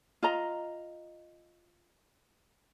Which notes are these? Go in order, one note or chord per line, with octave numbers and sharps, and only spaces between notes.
F4 D#5 A#5